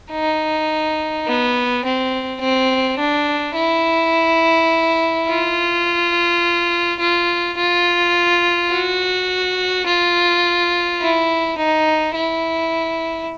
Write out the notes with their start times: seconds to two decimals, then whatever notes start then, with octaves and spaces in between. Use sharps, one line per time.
0.12 D#4
1.26 B3
1.84 C4
2.40 C4
2.99 D4
3.55 E4
5.28 F4
7.00 F4
7.57 F4
8.71 F#4
9.87 F4
11.01 E4
11.58 D#4
12.14 E4